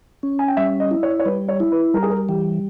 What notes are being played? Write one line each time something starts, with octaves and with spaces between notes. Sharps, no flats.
C#4
G#5
G5
G3 E5
D#5
E4
C#5
C#5
G3 B4
C#5
E4
B4
G3 A#4
G#4
A#4
E3 G4